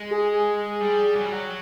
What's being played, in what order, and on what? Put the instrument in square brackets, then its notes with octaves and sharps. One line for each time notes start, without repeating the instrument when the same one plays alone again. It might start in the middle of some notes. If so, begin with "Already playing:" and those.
Already playing: [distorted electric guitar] G#3
[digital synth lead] G#4
[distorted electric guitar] G3
F#3
G3
F#3